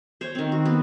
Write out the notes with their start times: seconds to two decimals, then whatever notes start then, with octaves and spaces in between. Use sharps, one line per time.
0.21 C5 C#5
0.35 D#3 C4
0.52 F#4
0.65 B3